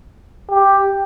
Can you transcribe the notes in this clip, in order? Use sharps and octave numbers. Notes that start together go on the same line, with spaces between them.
G4